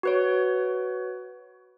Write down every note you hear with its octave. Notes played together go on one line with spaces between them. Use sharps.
F#4 B4 C#5